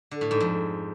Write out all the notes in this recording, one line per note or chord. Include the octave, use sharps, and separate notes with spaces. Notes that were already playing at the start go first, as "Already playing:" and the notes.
D3
A2
G#2
F2